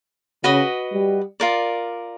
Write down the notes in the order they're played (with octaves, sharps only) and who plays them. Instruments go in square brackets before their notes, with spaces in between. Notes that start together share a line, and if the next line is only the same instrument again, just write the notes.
[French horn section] C#3 [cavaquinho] F#4 B4 D#5
[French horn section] G3
[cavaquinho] F4 A#4 D5